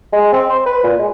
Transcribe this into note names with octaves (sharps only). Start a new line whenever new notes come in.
G#3
C4
C5
B4
A#2
G#3